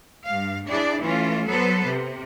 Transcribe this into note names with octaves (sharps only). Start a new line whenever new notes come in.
G2 F5
D4 E4 G#4 D5
E3 A3 C#4 F4
F#3 B3 A4 B4 C5
C3